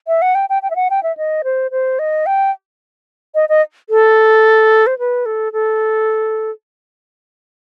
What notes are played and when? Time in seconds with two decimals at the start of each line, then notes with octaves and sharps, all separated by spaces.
0.07 E5
0.22 F#5
0.35 G5
0.49 G5
0.62 G5
0.70 E5
0.76 F#5
0.90 G5
1.03 E5
1.17 D#5
1.44 C5
1.71 C5
1.99 D#5
2.26 G5
3.35 D#5
3.49 D#5
3.90 A4
4.87 C5
4.98 B4
5.26 A4
5.53 A4